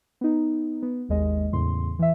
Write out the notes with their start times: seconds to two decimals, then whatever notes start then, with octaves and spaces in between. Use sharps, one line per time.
0.21 B3 D#4
0.83 B3
1.09 G#1 D#2 G#3 D#5
1.53 E2 A2 C#3 C6
1.99 E3 E5